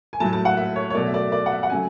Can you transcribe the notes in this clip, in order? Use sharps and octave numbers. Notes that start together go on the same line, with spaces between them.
G#5
A2 F#3 A3 A5
A5
F#5
E5
C#5
C#5
B2 F#3 A3 D5
E5
D5
D5
F#5
E5
F#5
C#3 F#3 A3 G#5